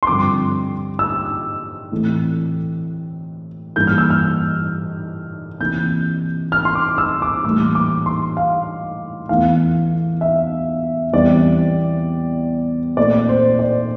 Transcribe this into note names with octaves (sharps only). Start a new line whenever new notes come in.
C6
G2 D3 F3 C4 D6
E6
A2 E3 A3 C4
G2 E3 A#3 G6
F6
E6
F6
C3 E3 A#3 G6
F6
C6
D6
E6
D6
A2 E3 G3 A#3 D6
D6
C6
F5
E2 E3 A3 F5
E5
E2 E3 G3 C4 D5
A#2 A3 C4 D5
C5
D5